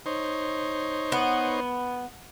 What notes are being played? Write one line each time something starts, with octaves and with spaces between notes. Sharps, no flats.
D#4 C5 C#5
B3